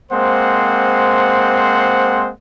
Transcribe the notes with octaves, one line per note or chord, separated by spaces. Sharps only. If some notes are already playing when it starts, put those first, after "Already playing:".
G#3 A#3 C4 C5 F#5